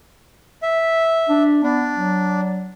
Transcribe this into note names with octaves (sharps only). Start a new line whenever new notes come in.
E5
D4
B3 D4
F#3